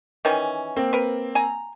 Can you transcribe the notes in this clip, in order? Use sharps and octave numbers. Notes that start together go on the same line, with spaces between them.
D#3 E3 C#4
A#3 C4
A#4 B4
G#5 A#5